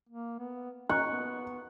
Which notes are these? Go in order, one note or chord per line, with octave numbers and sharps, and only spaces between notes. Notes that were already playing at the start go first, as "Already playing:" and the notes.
A#3
B3
C#4 C#6 F#6
B3